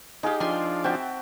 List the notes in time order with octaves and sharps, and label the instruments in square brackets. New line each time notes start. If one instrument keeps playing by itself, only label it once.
[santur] G#3 G#4 F5 [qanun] D#4 G4
[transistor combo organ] F3 D4 [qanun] G#5 C6
[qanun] C4 E5 [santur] F#4 G5 A5